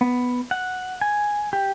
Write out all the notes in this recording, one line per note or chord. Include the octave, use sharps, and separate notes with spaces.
B3
F#5
G#5
G4